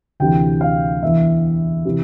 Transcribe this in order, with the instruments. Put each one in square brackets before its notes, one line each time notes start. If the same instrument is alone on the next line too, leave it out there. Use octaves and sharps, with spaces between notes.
[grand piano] D2 C3 E3 G5
F5
E2 E3 E5
C3 E3